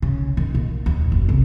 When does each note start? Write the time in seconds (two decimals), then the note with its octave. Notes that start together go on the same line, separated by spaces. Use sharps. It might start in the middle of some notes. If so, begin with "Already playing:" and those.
0.02 C#3
0.37 D#3
0.55 A#2
0.86 D#2
1.12 F#1
1.29 C2